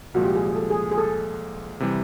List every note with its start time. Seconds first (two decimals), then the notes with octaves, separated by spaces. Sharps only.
0.14 C2 A#2 F3 G#3 F#4
0.25 G4
0.36 G#4
0.46 G#4
0.56 A4
0.70 G#4
0.91 G#4
0.98 A4
1.80 C3 E3 G3